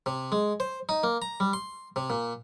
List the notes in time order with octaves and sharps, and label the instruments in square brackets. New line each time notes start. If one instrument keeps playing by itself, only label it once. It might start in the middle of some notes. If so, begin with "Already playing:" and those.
[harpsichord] C3
G#3
C5
D#4
A#3
A#5
G3
C6
C3
A#2